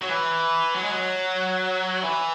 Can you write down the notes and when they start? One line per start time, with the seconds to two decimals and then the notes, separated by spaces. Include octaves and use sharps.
0.02 F#3
0.09 E3
0.74 F#3
0.82 G#3
0.91 F#3
2.03 E3